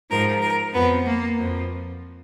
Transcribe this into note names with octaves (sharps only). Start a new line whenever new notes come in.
G#2 F3 A#4
A#4
F2 F3 B3
A#3
F2 F3